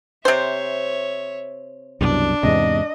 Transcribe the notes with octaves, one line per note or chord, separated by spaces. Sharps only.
C3 C5 C#5 E5
C2 F#2 B2 D4
E2 G#2 C3 D#5